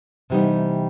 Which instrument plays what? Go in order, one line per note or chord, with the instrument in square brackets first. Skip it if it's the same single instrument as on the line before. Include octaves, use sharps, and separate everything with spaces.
[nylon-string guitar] C3 E3 G3 B3 D#4